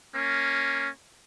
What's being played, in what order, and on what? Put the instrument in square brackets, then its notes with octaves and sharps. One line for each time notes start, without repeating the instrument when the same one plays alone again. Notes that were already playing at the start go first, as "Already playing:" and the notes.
[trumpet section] A#3 C#4